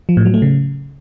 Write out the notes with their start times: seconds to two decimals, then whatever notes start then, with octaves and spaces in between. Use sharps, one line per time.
0.09 F3
0.17 A2
0.25 F#3
0.34 A3
0.42 C#3